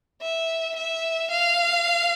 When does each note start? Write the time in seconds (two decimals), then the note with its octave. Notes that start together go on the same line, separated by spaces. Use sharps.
0.22 E5
0.76 E5
1.30 F5